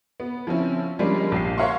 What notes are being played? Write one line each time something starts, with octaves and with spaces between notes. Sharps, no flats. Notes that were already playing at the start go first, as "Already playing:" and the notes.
B3
F3 C4 C#4 E4
F3 G3 G#3 A#3 C#4 D4
A#1 G4 C7
A#4 C#5 F5 F#5 C6